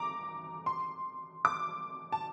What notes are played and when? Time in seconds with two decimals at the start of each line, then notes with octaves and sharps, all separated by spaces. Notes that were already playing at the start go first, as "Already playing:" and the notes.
Already playing: A#5 D6
0.66 C6
1.45 D6
2.12 A5